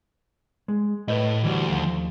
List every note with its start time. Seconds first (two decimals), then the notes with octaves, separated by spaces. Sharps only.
0.68 G#3
1.08 A2 B4 C5 D#5
1.43 D2 E3 G3 F#4
1.67 D#2 F3